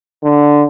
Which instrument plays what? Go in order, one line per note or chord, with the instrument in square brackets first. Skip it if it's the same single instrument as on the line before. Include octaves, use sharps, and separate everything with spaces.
[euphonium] D3